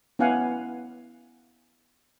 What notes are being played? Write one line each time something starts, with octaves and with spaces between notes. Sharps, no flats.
B3 C#4 E4 F5 F#5 G#5